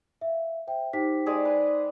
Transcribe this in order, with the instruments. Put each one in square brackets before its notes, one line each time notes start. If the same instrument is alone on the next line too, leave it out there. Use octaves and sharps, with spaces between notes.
[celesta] E5 F5
C5 E5 G5
[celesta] D#4 C5 B6 [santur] G4
[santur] G#3 G#4 D5
B4 G#5